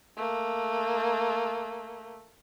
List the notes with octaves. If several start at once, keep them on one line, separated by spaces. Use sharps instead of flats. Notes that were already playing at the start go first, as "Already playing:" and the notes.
A3 A#3